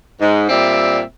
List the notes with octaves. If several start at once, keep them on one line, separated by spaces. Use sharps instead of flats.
G#2
A#2 G3 C4 D5 E5